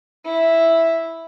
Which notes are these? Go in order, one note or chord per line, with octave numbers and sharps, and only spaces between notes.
E4